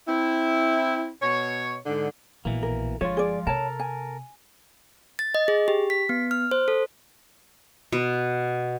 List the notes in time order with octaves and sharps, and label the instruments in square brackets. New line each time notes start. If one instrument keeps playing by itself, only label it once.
[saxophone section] C4 E4
B2 C#5
G#2 D3
[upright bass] A#1 [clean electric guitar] B2 E3 A#3
[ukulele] A#4
[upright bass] G1 [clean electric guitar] F3 G#3 F4 [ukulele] C#5
[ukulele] G#4 D5
[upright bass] C3 [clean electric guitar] A4 A#4 [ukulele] C#5 A5
[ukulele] G#5
[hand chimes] A6
D#5
G#4
G4
B6
B3
F6
C5
A4
[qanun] B2